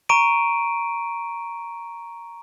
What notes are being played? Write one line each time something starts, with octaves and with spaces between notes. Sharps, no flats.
A#5 C#6 D7 D#7